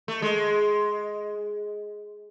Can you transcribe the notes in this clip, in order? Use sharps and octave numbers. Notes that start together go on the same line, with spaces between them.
A3
G#3